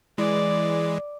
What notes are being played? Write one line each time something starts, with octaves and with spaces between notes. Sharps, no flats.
E3 G#3 D5